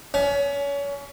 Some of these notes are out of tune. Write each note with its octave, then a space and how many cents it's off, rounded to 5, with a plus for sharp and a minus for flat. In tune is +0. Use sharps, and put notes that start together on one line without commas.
C#4 +30